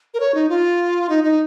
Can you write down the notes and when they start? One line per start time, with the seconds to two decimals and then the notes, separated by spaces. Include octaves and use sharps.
0.14 A#4
0.20 C#5
0.35 D#4
0.49 F4
1.09 D#4
1.24 D#4